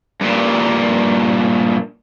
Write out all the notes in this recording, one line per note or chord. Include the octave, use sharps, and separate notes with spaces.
G2 A#2